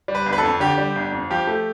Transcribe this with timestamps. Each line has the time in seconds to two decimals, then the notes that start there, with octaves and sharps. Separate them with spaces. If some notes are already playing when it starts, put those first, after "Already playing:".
0.08 G3
0.15 B4
0.26 G1
0.33 B4
0.38 A4
0.43 F2
0.60 D3 G4
0.78 G3
0.95 G1
1.12 F2
1.30 F3 G4
1.47 A3